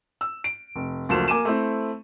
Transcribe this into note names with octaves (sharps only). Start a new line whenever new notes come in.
E6
D7
F1
F#1 D2 F3 E7
A#3 G#5 D6 D#7 E7
A3 C4 E4